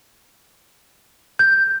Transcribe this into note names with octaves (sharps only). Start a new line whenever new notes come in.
G6